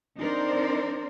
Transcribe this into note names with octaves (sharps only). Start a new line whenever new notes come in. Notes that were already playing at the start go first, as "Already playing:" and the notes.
C4 D4 D#4 A#4 C5 D5